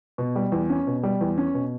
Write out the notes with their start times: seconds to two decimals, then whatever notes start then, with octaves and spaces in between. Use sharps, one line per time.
0.18 B2
0.36 G3
0.52 E2
0.70 C#4
0.87 B2
1.03 G3
1.21 E2
1.38 C#4
1.54 B2